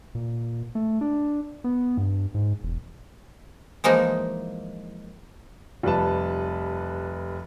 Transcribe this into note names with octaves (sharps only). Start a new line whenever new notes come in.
A#2
A3
D4
B3
G2
G#2
E1
E3 F3 G#3 A#3 D#4
F1 G3 B4 A5